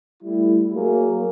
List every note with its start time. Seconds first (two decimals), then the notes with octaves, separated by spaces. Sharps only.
0.23 G3 A3 E4
0.73 F#3 A#3 G#4